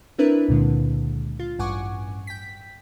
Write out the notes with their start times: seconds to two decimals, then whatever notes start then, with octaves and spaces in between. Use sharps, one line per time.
0.18 C4 D4 E4 A#4 B4
0.48 C#2 A#2 D3 G#3
1.39 F4
1.59 A1 G2 F#5 G#5 C#6 D6
2.27 G5 B6